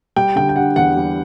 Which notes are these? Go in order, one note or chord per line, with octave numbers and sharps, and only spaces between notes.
G3 G5
D3 G5
G5
D4 F#5
E2 F#5
G3